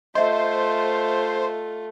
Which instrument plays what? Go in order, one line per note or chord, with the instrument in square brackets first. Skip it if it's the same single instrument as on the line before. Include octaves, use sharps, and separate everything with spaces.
[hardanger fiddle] A3 F4 [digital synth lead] C5 [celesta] D#5 E5